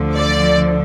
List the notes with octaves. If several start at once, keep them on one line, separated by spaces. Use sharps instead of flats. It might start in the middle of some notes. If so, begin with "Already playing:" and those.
Already playing: D2 D3 F3
D5